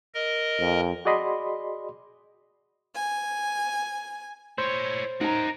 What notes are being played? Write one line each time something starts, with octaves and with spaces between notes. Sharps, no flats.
A#4 D#5
F2
F#4 G#4 D5 D#5 B5 C6
G#5
E4 C5 C#5
D#4 A#4 F#5 A#5